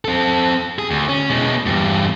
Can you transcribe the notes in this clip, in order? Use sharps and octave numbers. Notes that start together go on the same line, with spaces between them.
C4 A4
G#4
D2
C#4
B2 G#3
E2 G2